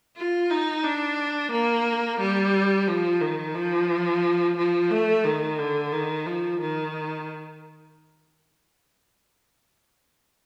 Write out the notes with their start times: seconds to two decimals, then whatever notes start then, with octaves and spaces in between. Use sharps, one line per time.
0.16 F4
0.50 D#4
0.84 D4
1.51 A#3
2.19 G3
2.87 F3
3.21 D#3
3.55 F3
4.57 F3
4.90 A3
5.24 D#3
5.58 D3
5.92 D#3
6.26 F3
6.60 D#3